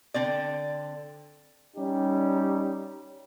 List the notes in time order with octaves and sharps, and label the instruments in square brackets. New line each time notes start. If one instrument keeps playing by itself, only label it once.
[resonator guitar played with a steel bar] D3 C4 D5
[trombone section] G3 C#4 D#4 G4